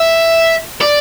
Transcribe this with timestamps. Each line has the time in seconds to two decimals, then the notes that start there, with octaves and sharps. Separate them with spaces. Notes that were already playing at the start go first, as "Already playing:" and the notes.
Already playing: E5
0.81 D5